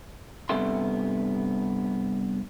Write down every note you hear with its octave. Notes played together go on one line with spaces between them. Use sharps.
G2 C3 B3 A4 E5 C6